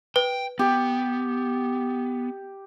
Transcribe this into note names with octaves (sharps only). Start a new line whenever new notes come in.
B4 G5
B3 G4